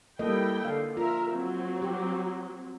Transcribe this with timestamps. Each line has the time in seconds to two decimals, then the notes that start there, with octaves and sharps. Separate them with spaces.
0.19 G3 A#3 E4 A4 D#5 G5
0.65 D3 F5
0.97 F4 A#4 E5
1.31 F#3 C4
1.82 G4